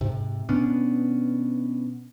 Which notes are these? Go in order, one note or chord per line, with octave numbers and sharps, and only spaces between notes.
G#2 C3
B2 B3 C#4 D4